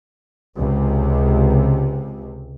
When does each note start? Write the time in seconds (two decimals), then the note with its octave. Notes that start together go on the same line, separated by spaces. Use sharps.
0.57 C#2 C3